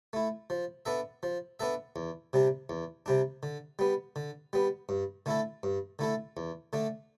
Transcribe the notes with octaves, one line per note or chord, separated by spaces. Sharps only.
A3 E4
F3
B3 D4 A4 E5
F3
B3 D4 A4 E5
E2
C3 G3 D4
E2
C3 G3 D4
D3
G3 B3
D3
G3 B3
G2
D3 A3 E4 A4
G2
D3 A3 E4 A4
E2
D3 A3 D4